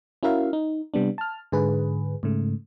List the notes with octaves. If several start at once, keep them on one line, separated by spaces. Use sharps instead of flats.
C#4 E4 F#4 A#4 E5 F5
D#4
C3 G3 B3 D4
A5 F6
G#2 D3 G#4 B4
G#2 C#3 A3